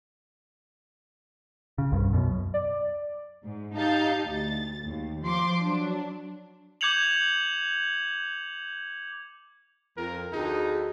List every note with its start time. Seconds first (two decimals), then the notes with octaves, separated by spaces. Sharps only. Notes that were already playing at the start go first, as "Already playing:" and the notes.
1.78 C#3
1.92 C2 G2
2.13 F#2 B2
2.54 D5
3.43 G#2
3.75 D#4 G4 F5 A5 G6 A6
4.24 D2 A6
4.86 D#2
5.24 F3 C6 D6
5.62 F#3 D4
6.81 D6 G6 G#6 C#7 F7 F#7
9.97 F2 A#4
10.33 D2 D#4 G#4